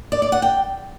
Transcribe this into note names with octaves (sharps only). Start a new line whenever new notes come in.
D5
D5
F#5
G5